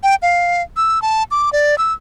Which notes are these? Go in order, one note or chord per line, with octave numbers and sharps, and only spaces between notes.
G5
F5
E6
A5
D6
D5
E6